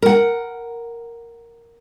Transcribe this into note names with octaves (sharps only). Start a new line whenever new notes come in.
A#4 F#5